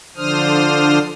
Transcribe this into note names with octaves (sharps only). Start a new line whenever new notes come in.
D3 F3 D4 C5 D#6 F6